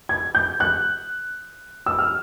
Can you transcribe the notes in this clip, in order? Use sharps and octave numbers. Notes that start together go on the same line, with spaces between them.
G#6
G6
F#6
E6
F6